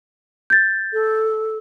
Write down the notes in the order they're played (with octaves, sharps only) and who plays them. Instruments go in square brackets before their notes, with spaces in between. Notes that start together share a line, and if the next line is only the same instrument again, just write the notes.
[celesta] G6 A6
[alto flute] A4